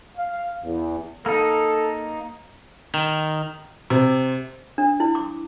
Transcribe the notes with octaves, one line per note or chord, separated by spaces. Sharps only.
F5
E2
A#3 D#4 A4
D#3
C3
D4
E4
D6